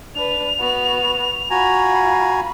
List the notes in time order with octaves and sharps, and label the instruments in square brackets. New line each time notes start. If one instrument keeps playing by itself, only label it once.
[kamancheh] D4 B4 [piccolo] F7
[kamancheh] B3 F#4
[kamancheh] F4 B5 [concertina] F#4 G#5 A#5